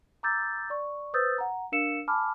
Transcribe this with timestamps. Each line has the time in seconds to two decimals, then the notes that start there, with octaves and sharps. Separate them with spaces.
0.23 A#5 D6 E6 G6 A6
0.70 D5 C#6
1.14 B4 C5 D#6 E6 G6 A6
1.38 F#5 A#5
1.72 D4 A#4 F5 E6 C#7 E7
2.08 G#5 A5 B5 D6 F6